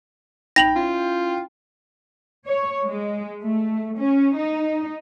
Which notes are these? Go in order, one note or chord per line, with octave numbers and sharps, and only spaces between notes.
A1 D#4 G5 B5 A#6 F7 F#7
C#4 E4 F4
C#5
G#3
A3
C#4
D#4